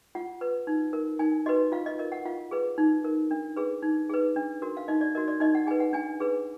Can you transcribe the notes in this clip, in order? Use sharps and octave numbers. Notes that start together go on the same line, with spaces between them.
F4 F#5
B4
D#4
A#4
D#4 G#5
F#4 B4 D#5
F4 F5
D#5
A#4 D#5
F#5
F4 F5
G#4 B4
D#4
A#4
D4
G#4 B4
D#4
G#4 B4
D4
F#4 A#4
F5
D#4 D#5
D5
F#4 A#4 D#5
D5
D#4 D#5
F#5
G#4 B4 G#5
F#5
D4 G#5
G#4 B4